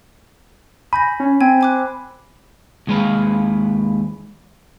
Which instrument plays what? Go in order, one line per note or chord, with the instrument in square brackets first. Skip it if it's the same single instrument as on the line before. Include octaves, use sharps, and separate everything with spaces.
[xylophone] G#5 G6 A#6 [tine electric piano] B5
[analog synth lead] C#4
[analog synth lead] C4 [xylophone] G5 G#5 G#6
[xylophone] G#5 D6 F#6
[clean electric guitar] D#2 G#3 B4 F5